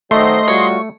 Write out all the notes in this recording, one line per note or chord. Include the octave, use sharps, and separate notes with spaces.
D#3 F#3 A3 C4 D#5 C6
G3 F4 F#4 C#5